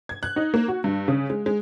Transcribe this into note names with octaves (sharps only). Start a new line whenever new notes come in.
G#6
F#6
D#4
A#3
F#4
G2
C#3
G#3
G#3